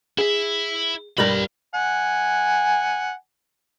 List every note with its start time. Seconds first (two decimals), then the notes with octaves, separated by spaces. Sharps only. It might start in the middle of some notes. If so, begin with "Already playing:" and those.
0.18 E4 G#4 E5
1.18 G2 G3 F4 A#4 B5
1.74 F#5 G#5